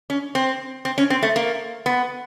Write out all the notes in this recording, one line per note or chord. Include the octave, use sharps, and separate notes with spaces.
C#4
C4
C4
C#4
C4
A3
A#3
B3